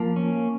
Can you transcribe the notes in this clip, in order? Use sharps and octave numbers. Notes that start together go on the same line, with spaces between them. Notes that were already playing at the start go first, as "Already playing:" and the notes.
Already playing: F3 A#3 A5 B5
C#4